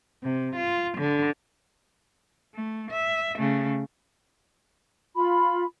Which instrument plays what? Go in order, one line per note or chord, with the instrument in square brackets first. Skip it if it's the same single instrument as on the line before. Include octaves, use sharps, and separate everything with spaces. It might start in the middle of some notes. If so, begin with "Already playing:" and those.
[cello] C3
F4
D3
A3
E5
C#3 A3
[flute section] F4 B5